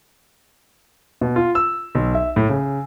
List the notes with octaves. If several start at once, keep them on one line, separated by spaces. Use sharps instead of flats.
B2
F4
E6
B1
E5
A2
C#3